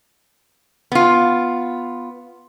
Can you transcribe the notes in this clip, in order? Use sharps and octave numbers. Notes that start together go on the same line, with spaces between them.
B3 F4